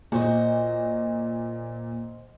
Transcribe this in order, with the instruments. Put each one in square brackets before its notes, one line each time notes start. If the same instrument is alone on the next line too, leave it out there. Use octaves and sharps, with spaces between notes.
[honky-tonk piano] A#2 [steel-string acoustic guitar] F#4 C5 D#5